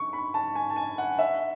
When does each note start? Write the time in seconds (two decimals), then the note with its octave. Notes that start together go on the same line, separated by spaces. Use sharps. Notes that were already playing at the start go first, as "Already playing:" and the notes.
Already playing: C#6
0.13 B5
0.34 A5
0.55 G#5
0.70 A5
0.76 G#5
0.98 F#5
1.19 E5